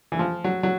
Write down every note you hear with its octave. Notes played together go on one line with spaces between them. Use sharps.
E3
F3
F#3
F#3